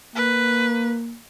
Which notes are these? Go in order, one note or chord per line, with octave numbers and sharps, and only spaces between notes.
A#3 B4